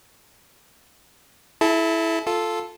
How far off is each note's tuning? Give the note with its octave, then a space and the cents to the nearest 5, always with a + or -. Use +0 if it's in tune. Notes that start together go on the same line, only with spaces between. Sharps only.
E4 +0 A4 -35 A5 +30
F4 +0 A4 +0